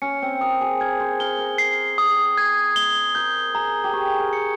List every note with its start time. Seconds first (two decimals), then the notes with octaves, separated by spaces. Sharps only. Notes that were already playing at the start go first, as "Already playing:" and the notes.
0.02 C#4 C#7
0.22 C4
0.41 A#4 D#6
0.61 G#4
0.80 A#4 G#6
1.00 C5
1.20 A#4 G7
1.39 A#4
1.58 C7
1.98 D#6
2.38 G#6
2.76 G7
3.15 A#4 G6
3.55 G#4 A#5
3.84 G4
3.93 G#4 C#6
4.19 A#4
4.33 C#7